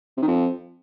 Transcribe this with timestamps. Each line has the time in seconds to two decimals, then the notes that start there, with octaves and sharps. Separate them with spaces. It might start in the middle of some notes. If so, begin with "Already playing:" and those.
0.17 C3
0.22 D#3
0.27 F2